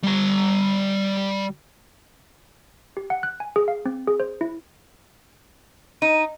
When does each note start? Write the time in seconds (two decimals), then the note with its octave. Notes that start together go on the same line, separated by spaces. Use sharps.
0.03 G3 A#5
2.97 G4
3.10 F#5
3.23 F#6
3.40 G#5
3.56 G#4
3.68 F5
3.86 C4
4.07 G#4
4.20 C5
4.41 E4
6.02 D#4 D#7